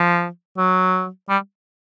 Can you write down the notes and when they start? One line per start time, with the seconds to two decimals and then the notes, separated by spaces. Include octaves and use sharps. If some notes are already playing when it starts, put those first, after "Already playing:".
Already playing: F3
0.58 F#3
1.29 G3